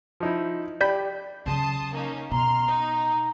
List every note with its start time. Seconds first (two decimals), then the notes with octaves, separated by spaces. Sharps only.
0.20 F3 D#4 E4
0.81 G4 D5 B5 G6 B6
1.46 C#3 F#3 A5 C6 D#6
1.94 A#3 C#4 D#4
2.31 B2 A#5 C6 F6
2.66 D#4